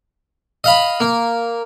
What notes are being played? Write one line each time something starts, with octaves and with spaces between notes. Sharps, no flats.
D#5 F5 B5
A#3